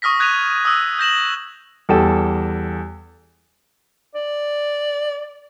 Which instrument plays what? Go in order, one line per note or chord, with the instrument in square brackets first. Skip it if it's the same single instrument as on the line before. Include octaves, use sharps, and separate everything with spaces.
[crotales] C#6 D#6 F6 A#6 B6
D#6 F#6 G#6 B6 D#7 F7
D#6 E6
G6 A#6 E7 F#7
[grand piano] E2 G3 A4 G5 E7
[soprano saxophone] D5